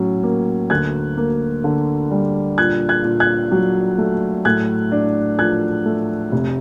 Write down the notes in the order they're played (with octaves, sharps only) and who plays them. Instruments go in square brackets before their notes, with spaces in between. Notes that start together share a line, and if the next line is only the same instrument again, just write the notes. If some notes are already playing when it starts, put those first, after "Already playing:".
Already playing: [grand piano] A2 F#3 C#4
A#3
D2 F#6 G#6
A#3
D3
G3
A#2 F#6 G#6
F#6 G#6
A#2
F#6 G#6
F#3
A3
A2 F#6 G#6
D4
F3 F#6 G#6
A3
F1